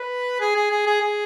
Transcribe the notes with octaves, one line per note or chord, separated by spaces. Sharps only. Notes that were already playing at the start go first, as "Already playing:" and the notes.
Already playing: B4
G#4
G#4
G#4
G#4
G#4